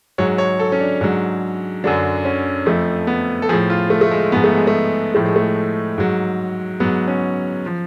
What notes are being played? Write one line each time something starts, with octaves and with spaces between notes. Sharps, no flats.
G#2 F#3 C#5
C#5
A4
C#4
D4
G#2 F#3
F#2 D3 F#3 D4
C#4
F2 F3 A3
B3
A4
A2 F3 G#4
F4
A3
A3
G#3
G#2 F3 B3
A3
G#3
A3
A2 F3 A3
G#3
A3
G#2 F#3
G#2 F#3 B3
C#4
F3